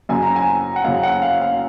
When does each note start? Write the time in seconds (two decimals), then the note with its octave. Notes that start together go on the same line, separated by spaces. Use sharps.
0.09 F#2 C#3 G#5
0.23 A#5
0.36 G#5
0.76 F#5
0.84 F#2 C#3 F5
1.03 F#5
1.22 F5
1.42 F5